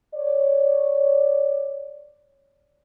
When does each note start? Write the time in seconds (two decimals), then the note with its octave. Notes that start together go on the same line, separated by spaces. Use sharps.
0.15 C#5 D5